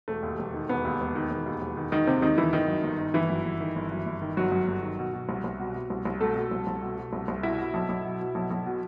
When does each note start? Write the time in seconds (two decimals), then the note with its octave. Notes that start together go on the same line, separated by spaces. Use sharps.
0.08 E1 A3
0.23 D#2
0.39 E1
0.54 D#3
0.69 E1 B3
0.85 D#2
1.00 E1
1.15 D#3
1.30 E1
1.46 D#2
1.61 E1
1.77 D#3
1.92 E1 D#3 D#4
2.07 D#2 C3 C4
2.22 E1 D#3 D#4
2.38 D#3 E3 E4
2.53 G1 D#3 D#4
2.68 F#2
2.83 G1
2.99 D#3
3.14 G1 E3 E4
3.30 F#2
3.45 G1
3.60 D#3
3.76 G1
3.91 F#2
4.06 G1
4.22 D#3
4.37 G1 F#3 F#4
4.52 F#2
4.68 G1
4.83 D#3
4.99 B2
5.14 B2
5.29 C2
5.44 C2
5.59 B2
5.75 B2
5.90 C2
6.05 C2
6.21 B2 A3 A4
6.36 B2
6.51 C2
6.67 C2
6.82 B2
6.98 B2
7.13 C2
7.28 C2
7.43 B2 E4 E5
7.58 B2
7.74 B1
7.89 B1
8.05 B2
8.20 B2
8.35 B1
8.51 B1
8.66 B2